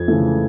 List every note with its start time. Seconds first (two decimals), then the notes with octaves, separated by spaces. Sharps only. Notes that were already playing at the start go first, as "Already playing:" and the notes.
Already playing: F2 G#6
0.08 C#3 E3 A3